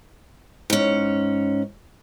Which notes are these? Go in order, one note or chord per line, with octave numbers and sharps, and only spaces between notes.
G#2 C#4